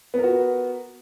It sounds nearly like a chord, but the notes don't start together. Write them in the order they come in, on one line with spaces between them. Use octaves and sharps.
B3 A#4 F#4